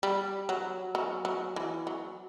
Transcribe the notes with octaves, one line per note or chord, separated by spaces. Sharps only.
G3
F#3
F#3
F#3
E3
F#3